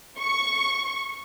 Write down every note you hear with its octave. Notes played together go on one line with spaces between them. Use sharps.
C#6